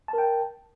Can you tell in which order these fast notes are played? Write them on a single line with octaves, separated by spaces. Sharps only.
A5 A#4 G5